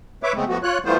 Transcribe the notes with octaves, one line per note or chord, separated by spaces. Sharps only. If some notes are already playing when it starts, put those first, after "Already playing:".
B4 C#5 E5 D6
C#3 G#3 A3 B3 C4
F3 A3 B3 F#4
F4 C#5 F#6
E3 G3 A3 B3 F4 C5